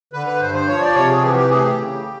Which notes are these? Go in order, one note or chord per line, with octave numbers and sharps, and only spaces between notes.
D3 B4
B4
G2 C5
C5
F3 C#5
D5
C3 C#5
G#4
E3 G4
F#4
G4
A2 G#4
G4
C#3